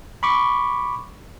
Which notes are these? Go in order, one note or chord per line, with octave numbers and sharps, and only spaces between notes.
B5 C#6 D6